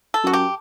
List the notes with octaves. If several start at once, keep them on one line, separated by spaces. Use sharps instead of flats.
A4
F#2 F#4
G4